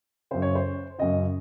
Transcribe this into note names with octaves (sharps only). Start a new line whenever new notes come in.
F#2 C#3 C5
C#5
C5
F#2 C#3 D#5